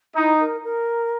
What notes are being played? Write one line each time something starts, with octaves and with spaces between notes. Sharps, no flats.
D#4 E4
A#4
A#4